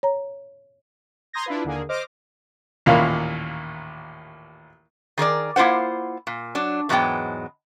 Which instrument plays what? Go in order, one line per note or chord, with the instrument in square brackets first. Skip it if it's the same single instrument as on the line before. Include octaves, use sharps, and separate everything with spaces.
[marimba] C#5 A#5
[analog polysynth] A#5 C6 D#6 G6 G#6 A#6
D4 E4 F4 B4
D#2 D3 A#3 G#4
C5 D#5 D6 F6 A#6
[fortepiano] A1 D#2 A#2 A#3 F5 B5
[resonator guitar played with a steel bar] D#3 G#4 A#4 D5
A#3 E4 F4 C5 F#5
A#2
F#3 D4
E2 G#2 F#3 G#3 B3 G5